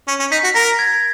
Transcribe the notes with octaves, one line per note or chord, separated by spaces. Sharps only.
C#4
C#4
D#4 B6
F#4
A#4 A#6
G#6